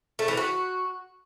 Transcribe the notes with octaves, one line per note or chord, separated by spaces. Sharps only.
A3
E3
F#4